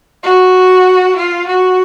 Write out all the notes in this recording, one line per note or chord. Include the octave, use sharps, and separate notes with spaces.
F#4
F4
F#4